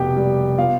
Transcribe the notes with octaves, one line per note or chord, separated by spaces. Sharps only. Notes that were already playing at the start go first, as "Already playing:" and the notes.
Already playing: F1 B2 G4 G5
G3
B3 F4 F5